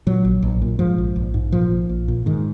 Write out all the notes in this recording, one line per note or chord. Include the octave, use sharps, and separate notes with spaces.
A#2 F#3
A#1
A#1
A#2
G#2 F3
A#1
A#1
G#2
A#2 F3
A#1
A#1
A#2
G#2 D#3